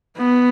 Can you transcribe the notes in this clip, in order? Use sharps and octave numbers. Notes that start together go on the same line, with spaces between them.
B3